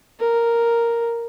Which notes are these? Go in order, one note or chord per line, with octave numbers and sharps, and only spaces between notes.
A#4